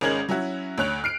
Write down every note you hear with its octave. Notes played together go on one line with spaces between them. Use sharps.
G#1 G#3 C#4 A#4 G#6 F#7
F#3 C#4 E4 F#4
D2 C#5 F#6 F7
F6 C7 D7